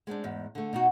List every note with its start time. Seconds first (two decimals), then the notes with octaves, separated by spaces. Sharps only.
0.07 G#3 B3 C4 D4
0.24 E2 G#2
0.55 D3 A3
0.73 B2 D#4 F#4